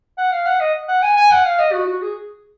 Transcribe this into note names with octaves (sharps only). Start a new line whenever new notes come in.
F#5
F5
F#5
D#5
F#5
G#5
G#5
F#5
F5
D#5
F#4
F#4
G#4